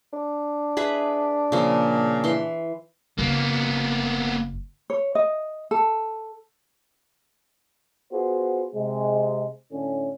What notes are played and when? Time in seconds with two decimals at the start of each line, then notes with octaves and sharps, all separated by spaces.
0.13 D4
0.77 G#4 B4 E5
1.52 A#2 C#3 F3
2.24 E3 C6
3.19 F#1 A#3 B3
4.90 C#5
5.15 D#5
5.71 A4
8.12 B3 F4 F#4 G#4 C5
8.75 C3 G#3
9.72 A2 D3 C#4